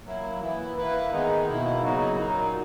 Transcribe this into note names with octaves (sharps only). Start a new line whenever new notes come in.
F#3 A#3 E4
E3 B3 E4
A#3 E4 B4
D#3 G#3 B3 D#4
B2 A#3 E4
C#3 F#3 B3 D#4 F#4
A#2 F#3 A#3 D#4